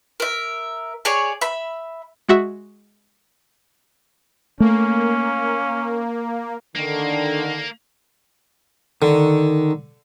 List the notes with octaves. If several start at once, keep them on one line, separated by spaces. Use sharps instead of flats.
A#4 E5
G#4 C#5 D5 G#5
E5 B5
G#3 F#4 E5
A3 A#3 C#4
D3 D#3 A#3
D3 D#3